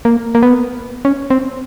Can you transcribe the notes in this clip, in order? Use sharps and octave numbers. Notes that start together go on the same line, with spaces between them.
A#3
A#3
B3
C#4
C4